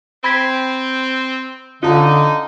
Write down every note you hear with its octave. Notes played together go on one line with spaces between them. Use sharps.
C4 B5 G#6 B6
D3 C#4 D#4 F4 A5 D#6